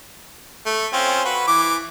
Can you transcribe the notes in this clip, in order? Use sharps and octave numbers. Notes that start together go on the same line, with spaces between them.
A3
C4 C#4 F4
F#4 B4
E3 D6